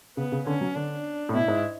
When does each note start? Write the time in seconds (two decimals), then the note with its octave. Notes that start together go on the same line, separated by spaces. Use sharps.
0.17 C#3 B3
0.32 C#3
0.46 D3 C#4
0.61 F#3
0.75 D3 D4
1.29 A2
1.33 B2 E4
1.48 G#2